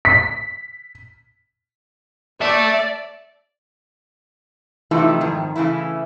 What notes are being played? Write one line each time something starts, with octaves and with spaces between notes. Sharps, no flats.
B6
D5 E5 A5
C3 E3 F3 A3 D#4 E4
F2 G#2 D#3
C#3 E3 A3 E4